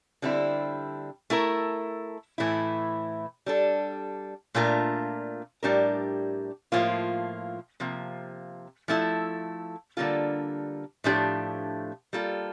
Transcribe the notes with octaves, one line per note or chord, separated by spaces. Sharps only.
D3 G3 C4 E4
A3 E4 A#4
A2 E3 A3 E4
G3 D4 A4
A#2 A3 D4 F4 A#4
A2 G3 D4 G4 A#4
A2 F3 A#3 F4
C3 F3 A#3
F3 A3 E4 A4
D3 G3 A#3 F4 A4
A2 F3 A3 D4 G4
G3 A#3 F4 A4